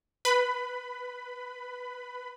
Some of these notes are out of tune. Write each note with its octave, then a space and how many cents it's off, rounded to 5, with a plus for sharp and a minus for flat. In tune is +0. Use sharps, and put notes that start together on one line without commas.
B4 +0 B5 +20